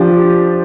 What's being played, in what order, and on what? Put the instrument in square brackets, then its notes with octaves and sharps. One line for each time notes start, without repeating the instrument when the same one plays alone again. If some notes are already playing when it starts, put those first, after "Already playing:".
Already playing: [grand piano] F3 D4 G4